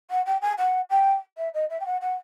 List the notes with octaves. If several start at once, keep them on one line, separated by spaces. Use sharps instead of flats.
F#5
G5
G#5
F#5
G5
E5
D#5
E5
G5
F#5
F#5